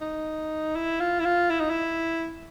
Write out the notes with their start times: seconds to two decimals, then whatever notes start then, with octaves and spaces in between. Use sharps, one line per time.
0.01 D#4
0.76 E4
1.01 F4
1.20 E4
1.25 F4
1.50 E4
1.60 D#4
1.70 E4